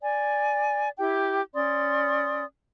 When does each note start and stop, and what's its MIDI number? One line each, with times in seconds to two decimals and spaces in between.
0.02 0.89 74
0.02 0.89 80
0.98 1.41 64
0.98 1.41 67
0.98 1.41 79
1.55 2.44 61
1.55 2.44 74
1.55 2.44 84
1.55 2.44 87